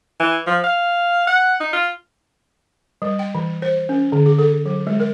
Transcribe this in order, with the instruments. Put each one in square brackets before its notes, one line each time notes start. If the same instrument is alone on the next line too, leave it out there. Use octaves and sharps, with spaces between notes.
[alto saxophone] E3
F3
F5
F#5
D#4
F4
[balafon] G3
G5
E3
C5
C#4
D3
G#4
A4
F#3
G#3
A#4